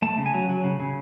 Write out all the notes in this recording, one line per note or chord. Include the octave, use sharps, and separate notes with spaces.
A3 A5
C#3
G#5
F#3
F#3
C#3
C#3